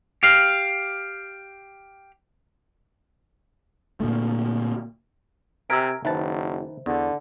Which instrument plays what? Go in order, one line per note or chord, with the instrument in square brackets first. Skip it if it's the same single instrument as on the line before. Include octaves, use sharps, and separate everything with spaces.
[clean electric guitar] G4 F5
[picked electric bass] A#2 D3 A3
[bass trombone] C3 [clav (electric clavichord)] A#4 E5 G#5 [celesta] E6 G#6 D7
[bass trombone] F#1 [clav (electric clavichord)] D#3 B4 A5 [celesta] C5 E5
[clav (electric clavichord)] E2 [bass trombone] D3